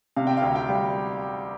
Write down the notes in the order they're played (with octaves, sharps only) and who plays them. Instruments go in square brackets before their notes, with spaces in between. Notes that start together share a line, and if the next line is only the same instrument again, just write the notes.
[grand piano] C3 [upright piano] F5
[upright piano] G5
[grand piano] D2 [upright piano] F5
[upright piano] G5
[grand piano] G3